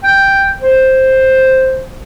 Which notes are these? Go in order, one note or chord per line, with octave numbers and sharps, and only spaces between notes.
G5
C5